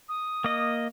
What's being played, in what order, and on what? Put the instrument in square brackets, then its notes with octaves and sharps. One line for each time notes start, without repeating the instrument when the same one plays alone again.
[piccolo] D#6
[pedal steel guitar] A#3 D#5